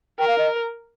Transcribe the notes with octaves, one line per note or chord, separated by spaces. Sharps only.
A#4 G5
F5
D#5